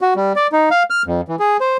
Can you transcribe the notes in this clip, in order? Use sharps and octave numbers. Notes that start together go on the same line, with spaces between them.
F#4
G3
D5
D#4
F5
F6
F2
E3
G#4
C5